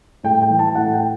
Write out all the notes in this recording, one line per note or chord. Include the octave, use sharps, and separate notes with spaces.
A2 G5
G5
E3
A5
A2 F#5
G5